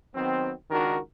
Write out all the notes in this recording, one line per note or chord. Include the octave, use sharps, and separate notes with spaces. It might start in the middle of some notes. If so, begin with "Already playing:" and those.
D#3 F#3 B3 C4
C#2 D#3 D4 D#4 F#4 A#4